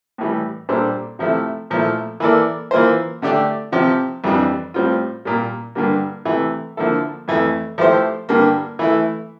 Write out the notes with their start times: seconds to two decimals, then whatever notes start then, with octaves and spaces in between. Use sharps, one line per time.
0.18 A2 E3 G3
0.69 A#2 G3 D4 A4 C5
1.19 C3 F3 A3 E4
1.70 A#2 F3 A3 E4
2.20 E3 A#3 E4 A4 D5
2.71 E3 A#3 F4 C5
3.22 D3 A3 D4 G4 D5
3.72 C3 F3 C4 G4
4.24 F2 E3 G3 D4
4.74 A2 G3 C4 F4
5.25 A#2 G3 A#3
5.75 G2 D3 G3 A#3
6.25 C3 E3 A3
6.77 D3 F3 A#3 E4 A4
7.28 F2 E3 A3
7.78 F3 A3 E4 G4 C5
8.29 G2 D3 G3 A#3
8.79 E3 A3 E4